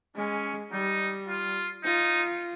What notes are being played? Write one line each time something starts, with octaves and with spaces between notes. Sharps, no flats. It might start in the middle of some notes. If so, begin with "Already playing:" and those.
G#3 C#4
G3 D#4
F4
D#4 F4